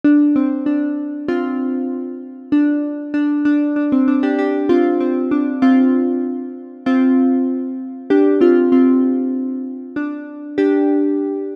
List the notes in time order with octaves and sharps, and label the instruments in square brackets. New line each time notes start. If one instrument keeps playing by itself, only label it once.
[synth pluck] D4
C4
D4
C4 F4
D4
D4
D4
D4
C4
D4
D4 G4
D4 G4
C4 F4
C4
D4
C4 F4
C4 F4
D4 G4
C4 F4
C4 F4
D4
D4 G4